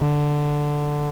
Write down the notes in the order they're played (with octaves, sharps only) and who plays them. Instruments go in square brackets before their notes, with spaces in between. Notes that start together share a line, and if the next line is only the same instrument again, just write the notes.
[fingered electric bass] D3